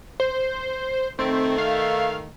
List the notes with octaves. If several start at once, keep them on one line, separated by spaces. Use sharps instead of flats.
C5
D#3 A3 C4
F5